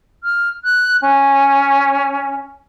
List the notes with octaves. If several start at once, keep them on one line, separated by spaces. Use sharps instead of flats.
F6
F#6
C#4